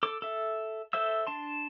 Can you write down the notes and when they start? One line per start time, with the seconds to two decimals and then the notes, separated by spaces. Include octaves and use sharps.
0.03 A4 D6
0.22 A4 E5
0.93 A4 C5 E5 E6
1.27 D4 A5 C6